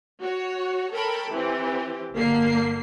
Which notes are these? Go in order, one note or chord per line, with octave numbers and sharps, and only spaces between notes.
F#4 C#5
A4 A#4 C#5 G5 A5 B5
E3 C4 G4
G1 D3 A#3 C7